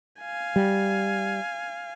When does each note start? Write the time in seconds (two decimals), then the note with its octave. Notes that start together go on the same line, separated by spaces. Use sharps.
0.21 F5 G#5
0.56 G3